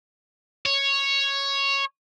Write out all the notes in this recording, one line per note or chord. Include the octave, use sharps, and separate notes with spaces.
C#5